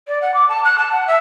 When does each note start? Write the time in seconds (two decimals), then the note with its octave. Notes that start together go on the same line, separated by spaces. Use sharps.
0.07 D5
0.22 F#5
0.34 D6
0.49 A5
0.65 F#6
0.78 A5
0.92 F#5
1.07 E5